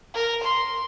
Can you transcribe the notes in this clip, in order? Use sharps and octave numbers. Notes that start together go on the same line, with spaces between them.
A#4
C6